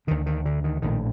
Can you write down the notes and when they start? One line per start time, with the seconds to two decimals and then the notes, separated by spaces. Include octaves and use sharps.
0.07 D2 D3 D#3
0.26 D#3
0.46 D3
0.64 D#3
0.82 A#1 A2 D#3